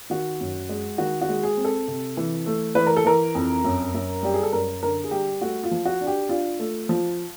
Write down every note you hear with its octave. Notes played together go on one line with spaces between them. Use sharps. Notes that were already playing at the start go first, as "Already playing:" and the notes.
D#3 F#4
F#2
G#3
D#3 F#4
F#4
G#3
G#4
C4
A4
C3
E3
A3
E3 B4
A#4
A4
E3 A#4
F2
F#2
F#2
G3 G4
G#4
A4
F#2 A#4
D3 A#4
G#4
G3 G4
A3 F#4
F4
F3
F#4
D4
G4
D4 F4
A3
F3